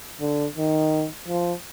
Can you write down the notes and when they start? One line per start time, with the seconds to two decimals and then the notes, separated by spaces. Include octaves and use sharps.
0.20 D3
0.56 D#3
1.28 F3